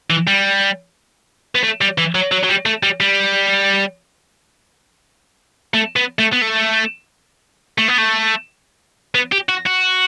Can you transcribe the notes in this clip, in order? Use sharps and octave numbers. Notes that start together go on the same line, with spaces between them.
E3
G3
B3
A3
G3
E3
F#3
F#3
F#3
G3
A3
G3
G3
A3
B3
A3
B3
A3
A3
B3
A3
B3
G4
F#4
F#4